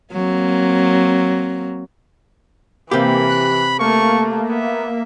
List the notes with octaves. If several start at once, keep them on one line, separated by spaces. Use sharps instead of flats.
F#3 A#3 C4
C3 E3 A#3 G4 B5
F#6
A3 A#3 C#6
B3 E5